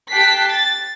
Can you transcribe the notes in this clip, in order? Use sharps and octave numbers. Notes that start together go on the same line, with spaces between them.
G4 G5 A5 F#6 B6 C7
A6